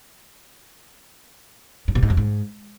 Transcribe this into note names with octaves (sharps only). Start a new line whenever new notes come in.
G2
B2
G#2
F2
G#2